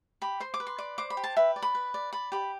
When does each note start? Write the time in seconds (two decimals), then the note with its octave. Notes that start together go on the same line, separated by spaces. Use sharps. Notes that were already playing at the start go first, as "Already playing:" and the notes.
0.22 G4 B5
0.40 C5 C6
0.54 D6
0.60 B4
0.67 C6
0.78 D5
0.98 C5 D6
1.10 B5
1.17 G4
1.24 A5
1.37 B4 E5
1.56 D5
1.62 B5
1.75 B4
1.94 D5
2.13 D5 B5
2.32 G4 B5